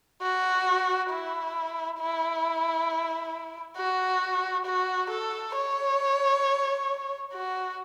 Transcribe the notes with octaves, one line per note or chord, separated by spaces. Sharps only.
F#4
E4
E4
F#4
F#4
A4
C#5
F#4